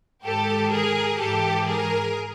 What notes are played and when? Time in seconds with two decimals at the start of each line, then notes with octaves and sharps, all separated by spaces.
0.24 G#2 D#3 G4 A4
0.71 G#4 A#4
1.19 G#2 E3 G4 A4
1.67 G#4 A#4